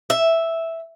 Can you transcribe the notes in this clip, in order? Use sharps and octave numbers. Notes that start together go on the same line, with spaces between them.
E5